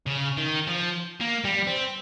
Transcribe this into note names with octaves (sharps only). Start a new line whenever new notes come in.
C#3
D#3
F3
A#3
G3
C4